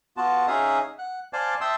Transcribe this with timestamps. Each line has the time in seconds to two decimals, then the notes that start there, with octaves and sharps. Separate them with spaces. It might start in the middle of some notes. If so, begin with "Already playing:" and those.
0.17 B3 F4 F#4 A5
0.47 C#4 D#4 G#4 E5 F5 D#6
0.98 F#5
1.33 C5 D5 F5 G#5 A5
1.61 E5 G5 A5 C6 D#6 E6